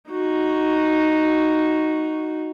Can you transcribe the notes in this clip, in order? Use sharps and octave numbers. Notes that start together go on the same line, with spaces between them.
D#4 F#4